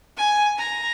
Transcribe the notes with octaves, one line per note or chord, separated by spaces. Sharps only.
G#5
A#5